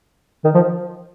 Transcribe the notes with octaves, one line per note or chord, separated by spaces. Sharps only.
D#3
F3